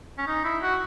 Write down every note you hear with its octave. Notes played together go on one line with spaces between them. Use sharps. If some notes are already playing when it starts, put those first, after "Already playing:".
C#4
D#4
E4
F#4